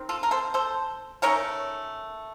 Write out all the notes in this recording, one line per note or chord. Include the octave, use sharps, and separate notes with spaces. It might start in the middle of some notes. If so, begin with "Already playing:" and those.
Already playing: D#3 C4
F4 A4
A#4
A4 C5
A4 C5
D#3 A3 C#4 A#4 C#5